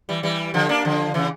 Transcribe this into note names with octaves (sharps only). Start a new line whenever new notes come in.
E3 G3
E3 G3
D3 F3
A#3 D4
D3 F3
C#3 E3